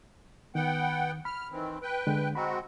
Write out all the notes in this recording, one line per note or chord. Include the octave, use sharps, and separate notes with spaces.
D#3 B3 F#5 G5
B5 F6
D#3 E3 C4
B4 G5
D3 G#3
G#3 C4 F#4 A#5 B5